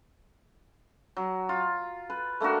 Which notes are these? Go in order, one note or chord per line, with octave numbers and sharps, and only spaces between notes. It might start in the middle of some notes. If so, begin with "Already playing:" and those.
F#3
F4
B4
A3 A#3 D4 F#4